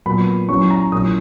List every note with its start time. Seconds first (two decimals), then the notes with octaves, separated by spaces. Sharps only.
0.06 A#2 F#3 B3 B5
0.49 F#3 C#4 E4 C#6
0.71 A#5
0.92 A#2 F#3 C#4 E4 D#6